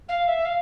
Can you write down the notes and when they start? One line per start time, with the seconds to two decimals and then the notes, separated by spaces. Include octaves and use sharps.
0.08 F5
0.27 E5
0.45 F5